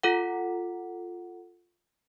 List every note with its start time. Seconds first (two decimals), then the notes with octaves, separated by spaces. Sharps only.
0.03 F4 A4 F#5